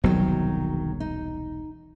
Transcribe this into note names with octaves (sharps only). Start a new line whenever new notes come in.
E1 C2 D#3 F#3 B3
D#4